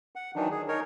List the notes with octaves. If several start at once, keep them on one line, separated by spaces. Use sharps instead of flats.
F#5
D#3 E3 F#3 D4 D#4
G#4
D#4 A#4 C#5